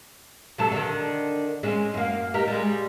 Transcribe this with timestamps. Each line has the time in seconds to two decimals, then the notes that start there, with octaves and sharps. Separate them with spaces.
0.58 C3 F#3 A4
0.72 D3 D#3
1.63 G#3 C4 C#4
1.94 F#2 A#3
2.34 D#4 G4 A#4
2.48 G3 G#3